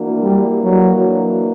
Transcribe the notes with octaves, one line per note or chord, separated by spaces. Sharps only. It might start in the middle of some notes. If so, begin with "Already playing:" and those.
Already playing: E3 A#3 D4 F#4
G3
F#3